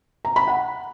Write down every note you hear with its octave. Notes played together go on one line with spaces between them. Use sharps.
A#5
B5
F#5